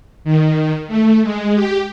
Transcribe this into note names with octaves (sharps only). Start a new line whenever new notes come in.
D#3
A3
G#3
G4